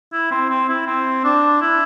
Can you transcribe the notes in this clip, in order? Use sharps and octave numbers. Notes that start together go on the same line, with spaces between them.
E4
C4
C4
E4
C4
D4
E4